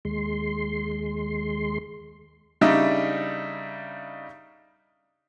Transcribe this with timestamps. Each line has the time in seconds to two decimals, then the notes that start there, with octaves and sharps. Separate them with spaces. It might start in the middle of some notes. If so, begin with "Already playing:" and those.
0.05 D#2 G#3 C6
2.61 C#3 G3 D4 D#4 E5